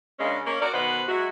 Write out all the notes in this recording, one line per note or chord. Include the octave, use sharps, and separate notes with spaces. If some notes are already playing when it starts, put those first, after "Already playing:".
C#3 G#3 A#3 C#4 D4
A#3 C#4
F#4 A#4 D5
B2 D#3 B4 C5 F#5
F#3 G#3 E4 F#4